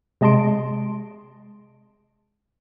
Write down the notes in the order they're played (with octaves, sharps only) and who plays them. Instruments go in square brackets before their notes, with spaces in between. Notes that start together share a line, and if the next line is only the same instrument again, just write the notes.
[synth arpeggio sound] C3 G#3 D#5 A5 C6 D7